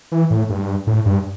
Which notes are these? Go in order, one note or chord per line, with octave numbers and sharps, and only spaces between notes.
E3
A2
G2
A2
G2